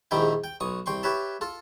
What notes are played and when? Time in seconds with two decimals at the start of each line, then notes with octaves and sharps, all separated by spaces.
0.11 A#1 G#2 D#3 E4 G4 G5
0.44 G5
0.60 B1 C#6 D#6
0.86 C2 G5 C6 C#6
1.03 G4 B4 C#5 E5 A5
1.41 F4 A4